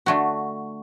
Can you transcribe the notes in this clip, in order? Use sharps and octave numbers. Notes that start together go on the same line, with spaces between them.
D3 A3 F#4